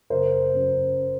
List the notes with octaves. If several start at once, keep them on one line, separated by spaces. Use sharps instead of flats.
F#1 A#4 C5
F#2 C#3